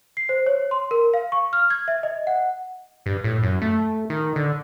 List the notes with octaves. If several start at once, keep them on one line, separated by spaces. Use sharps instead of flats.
C7
C5
C#5
C6
A#4
F5
C#6
F6
G#6
E5
D#5
F#5
G2
A2
F#2
A3
D#3
D3